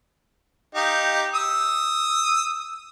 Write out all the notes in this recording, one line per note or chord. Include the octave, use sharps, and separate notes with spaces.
D#4 G4 F5
D#6 E6